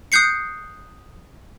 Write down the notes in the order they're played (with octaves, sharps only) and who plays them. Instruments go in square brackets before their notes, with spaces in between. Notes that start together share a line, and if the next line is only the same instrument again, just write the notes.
[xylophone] D#6 F#6 G6 C7 C#7